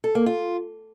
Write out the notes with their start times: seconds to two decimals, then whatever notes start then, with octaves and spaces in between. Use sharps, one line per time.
0.04 A4
0.15 A#3
0.26 F4